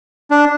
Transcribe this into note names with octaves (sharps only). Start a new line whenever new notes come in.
D4